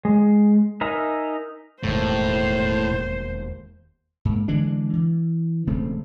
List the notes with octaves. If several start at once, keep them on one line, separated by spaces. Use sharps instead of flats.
G#3
D#4 A#4 E5 G#5 A#5
E1 D#2 A2 C5
G#2 A#3
D3 E3 G#3 D4
E3
E1 C#3 A3 C4